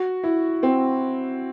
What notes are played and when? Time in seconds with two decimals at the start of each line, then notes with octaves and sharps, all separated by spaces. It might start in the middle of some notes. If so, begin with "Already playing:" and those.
Already playing: F#4
0.24 E4
0.63 C4